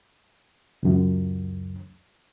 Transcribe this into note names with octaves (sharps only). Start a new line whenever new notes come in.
C#2 F#2